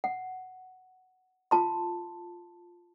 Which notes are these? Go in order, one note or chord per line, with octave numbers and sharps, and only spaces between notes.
F#5
F4 A5 C6